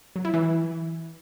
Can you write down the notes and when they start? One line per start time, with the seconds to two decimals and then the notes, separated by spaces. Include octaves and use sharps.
0.16 F#3
0.25 E4
0.34 E3